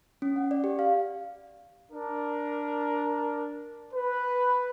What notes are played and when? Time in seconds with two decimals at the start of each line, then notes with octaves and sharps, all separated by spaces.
0.22 C#4
0.36 F#5
0.51 D5
0.64 G4
0.79 F5
1.92 D4 A#4
3.94 B4